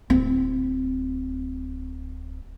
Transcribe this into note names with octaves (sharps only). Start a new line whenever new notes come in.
D1 C4